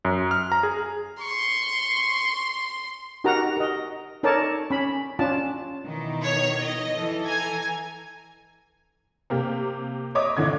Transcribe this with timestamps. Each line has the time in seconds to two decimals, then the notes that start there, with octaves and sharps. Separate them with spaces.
0.05 F#2
0.31 F6
0.52 A#5
0.63 G#4
1.21 C6 C#6
3.24 D#4 F#4 G4 A#4 F#5 A#5
3.57 A#4 D#5
4.23 D#4 A4 A#4 C#5 D5 A5
4.70 C#4 B5
5.19 C#4 D4 F4 A5
5.84 B2 D#3 E3
6.23 C#5
6.64 D#5
6.95 E3 A4
7.25 G#5 A#5 G#6
9.30 C3 A#3 G4
10.15 C#5 D#5 E5 D6 D#6
10.37 A#1 A2 D3 G#6